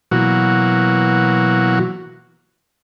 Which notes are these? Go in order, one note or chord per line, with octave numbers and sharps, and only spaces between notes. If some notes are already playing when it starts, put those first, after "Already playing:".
B2 E3 F#3 A#3 F#4